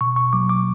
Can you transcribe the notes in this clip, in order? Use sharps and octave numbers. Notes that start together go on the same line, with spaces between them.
B2 C#6
C#6
F#3 A#3 D6
D6